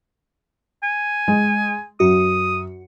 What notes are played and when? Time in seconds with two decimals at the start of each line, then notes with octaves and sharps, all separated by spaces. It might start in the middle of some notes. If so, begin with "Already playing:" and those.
0.83 G#5
1.28 G#3
2.00 F#2 F#4 D#6